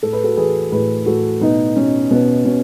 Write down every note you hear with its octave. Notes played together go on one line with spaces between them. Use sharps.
A2 A4
B4
F#4 A4
E3 G#4 B4
A2 G#4 B4
A2 F#4 A4
B2 B3 D#4
B2 C#4
B2 B3
B2 C#4